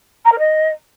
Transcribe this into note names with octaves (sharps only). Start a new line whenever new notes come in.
A#5
A#4
D#5